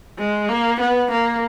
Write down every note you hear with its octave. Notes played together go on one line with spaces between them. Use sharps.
G#3
A#3
B3
A#3